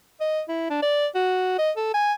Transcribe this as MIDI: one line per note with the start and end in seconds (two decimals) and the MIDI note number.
0.20 0.42 75
0.49 0.68 64
0.70 0.78 62
0.82 1.07 74
1.15 1.55 66
1.59 1.71 75
1.77 1.90 69
1.94 2.13 80